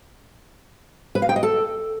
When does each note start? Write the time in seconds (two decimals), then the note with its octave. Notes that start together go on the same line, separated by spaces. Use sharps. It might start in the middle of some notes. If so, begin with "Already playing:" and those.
1.15 B4
1.22 F5
1.29 G5
1.36 D#5
1.43 A4